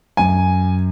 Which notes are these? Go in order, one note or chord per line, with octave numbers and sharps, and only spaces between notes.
F#2 G#5